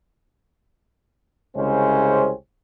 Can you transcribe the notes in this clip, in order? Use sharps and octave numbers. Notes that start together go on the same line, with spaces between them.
C2 C#3 G#3 C4 C#4 C5